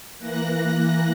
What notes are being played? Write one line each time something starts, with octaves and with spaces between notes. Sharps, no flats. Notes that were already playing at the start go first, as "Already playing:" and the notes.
E3 A#3 F#6 A#6